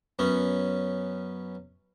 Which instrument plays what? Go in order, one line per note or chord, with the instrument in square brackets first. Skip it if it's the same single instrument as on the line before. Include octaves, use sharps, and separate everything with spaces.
[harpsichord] F#2 B3 C#4